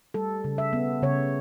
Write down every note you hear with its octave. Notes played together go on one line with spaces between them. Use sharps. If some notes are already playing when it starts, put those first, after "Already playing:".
G3 A4
C#3
E5
B3
C#3 C#5